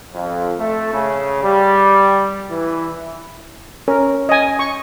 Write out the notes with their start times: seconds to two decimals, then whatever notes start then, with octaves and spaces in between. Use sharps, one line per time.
0.13 F2
0.58 A3
0.94 C#3
1.43 G3
2.49 E3
3.88 C#4 A#4
4.29 D#5 G#5
4.59 C#6